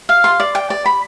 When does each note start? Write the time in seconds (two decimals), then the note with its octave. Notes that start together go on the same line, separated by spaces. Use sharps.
0.09 F5
0.24 C6
0.40 D5
0.55 G5
0.70 D5
0.86 B5